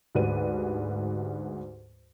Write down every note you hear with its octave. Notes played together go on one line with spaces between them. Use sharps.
D2 G#2 G4 B4 D5 D#7